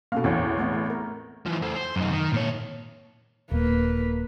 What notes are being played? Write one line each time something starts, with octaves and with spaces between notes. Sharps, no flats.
B2 A#3 C#4 A4 F5
A1 E2 C4 E4 C#5
A3 B3 E4
A3
A#4
E3 F3
A3 C5
C5
F#2 D#4
D#3
A#2 C#5
D#1 A#3 B4